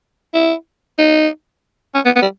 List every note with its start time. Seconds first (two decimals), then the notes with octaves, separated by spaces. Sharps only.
0.34 E4
0.99 D#4
1.95 C#4
2.05 B3
2.16 B3
2.22 G3